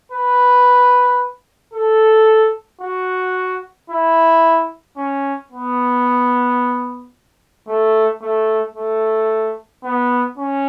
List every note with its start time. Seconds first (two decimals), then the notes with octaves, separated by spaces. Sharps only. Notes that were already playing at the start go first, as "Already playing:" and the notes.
0.12 B4
1.73 A4
2.81 F#4
3.90 E4
4.97 C#4
5.52 B3
7.68 A3
8.22 A3
8.75 A3
9.84 B3
10.38 C#4